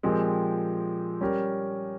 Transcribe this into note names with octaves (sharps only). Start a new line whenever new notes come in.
A#2 F3 G#3 C4 G4
G3 C#4 G4 A#4